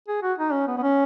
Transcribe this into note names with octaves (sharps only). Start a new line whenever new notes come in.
G#4
F#4
D#4
C#4
B3
B3
C#4